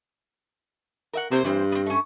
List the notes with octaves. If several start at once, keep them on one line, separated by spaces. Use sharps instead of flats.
A#4 E5 F#5
C3 A#3 A#4 C5
G2 E3 C4 C5
B3 C4
A3 C#4